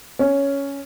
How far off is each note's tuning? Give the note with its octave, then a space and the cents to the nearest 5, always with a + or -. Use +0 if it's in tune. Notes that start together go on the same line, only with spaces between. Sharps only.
C#4 +5